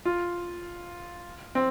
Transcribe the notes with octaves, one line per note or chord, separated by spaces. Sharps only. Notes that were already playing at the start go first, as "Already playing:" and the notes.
F4
C4